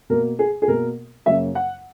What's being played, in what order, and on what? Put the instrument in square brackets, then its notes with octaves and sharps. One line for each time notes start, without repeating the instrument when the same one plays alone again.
[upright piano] B2 A#3 A#4
G#4
G#4
B2 A#3 A#4
F#2 C#3 F#3 A#3 E5
F#5